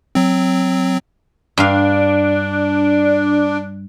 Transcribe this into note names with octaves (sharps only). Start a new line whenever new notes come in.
F#3 C4
G2 D4 F5